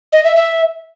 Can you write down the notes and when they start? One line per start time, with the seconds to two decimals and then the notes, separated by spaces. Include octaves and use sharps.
0.13 D#5
0.24 E5
0.36 E5